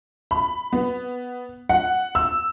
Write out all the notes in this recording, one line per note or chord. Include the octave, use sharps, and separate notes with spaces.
B5
B3
F#5
E6